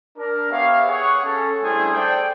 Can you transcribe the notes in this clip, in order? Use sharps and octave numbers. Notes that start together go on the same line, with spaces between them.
D4 A#4
B3 G4 C#5 E5 F5
G#4 C#5 F#5
C#4 A4
G3 A3 D4 E4 G#4 C5
A4 C5 D5 G5